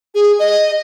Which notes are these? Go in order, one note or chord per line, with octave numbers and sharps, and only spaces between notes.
G#4
D#5